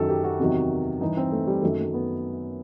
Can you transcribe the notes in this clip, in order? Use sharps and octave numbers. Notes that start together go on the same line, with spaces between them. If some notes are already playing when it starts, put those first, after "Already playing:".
Already playing: F#2 D#3 F#3 A4
G4
F#4
E2 C3 D#3 F#3
G2 E3 D#4
C4
A3
G3
F#2 D#3 F#3 A3
A3
B3